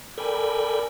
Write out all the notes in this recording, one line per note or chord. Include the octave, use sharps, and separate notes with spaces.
A4 A#4 D5 G5 G#5 B5